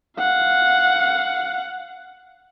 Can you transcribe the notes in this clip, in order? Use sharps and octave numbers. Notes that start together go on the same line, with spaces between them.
F5 F#5